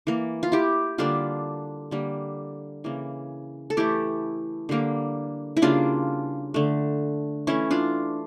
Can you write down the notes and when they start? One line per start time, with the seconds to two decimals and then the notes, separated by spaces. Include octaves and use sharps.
0.07 E3 A#3
0.43 F4
0.52 E4 G4
0.98 D3 G3 A#3 D4 F4
1.91 D3 G3 A#3
2.84 C#3 E3 A#3
3.70 A4
3.77 E3 A3 E4 G4
4.69 D3 G3 A#3
5.57 E4
5.62 C#3 G3 A#3 D4 F4
6.54 D3 A3
7.47 E3 A3 C#4 E4
7.71 D4 F4